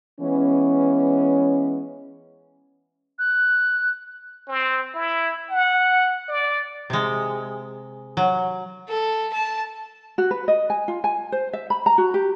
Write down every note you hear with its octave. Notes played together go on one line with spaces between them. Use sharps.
E3 G#3 B3 C#4
F#6
C4
E4
F#5
D5
C3 G#3
F#3
A4
A5
F#4
B4
D#5
G#5
F4
G#5
C5
E5
B5
A#5
F#4
G4